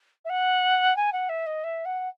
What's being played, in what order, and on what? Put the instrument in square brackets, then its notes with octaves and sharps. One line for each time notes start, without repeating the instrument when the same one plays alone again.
[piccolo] E5
F#5
G#5
F#5
E5
D#5
E5
F#5